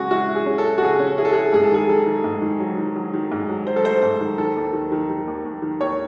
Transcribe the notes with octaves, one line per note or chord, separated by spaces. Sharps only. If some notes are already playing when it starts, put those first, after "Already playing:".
Already playing: C#3 G#3 C#4 F#4 G#4
E4 F#4
E4
G#4
C#4
A4
E4
F#4
C#3 G#4
C#4
E4 G#4
A4
E4 G#4
G#2 G#4
A4
D#3 G#4
D#3 A4
D#3
G#2
D#3
F#3
D#3
F#3
D#3
G#2
F#3
F#3 C5
A4
A3 C5
G#2
D#3
D#3 A4
D#2
D#3
D#3
D#3
D#2
D#2
D#3
D#2 C#5